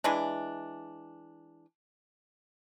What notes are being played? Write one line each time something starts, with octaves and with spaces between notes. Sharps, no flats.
E3 G#3 D4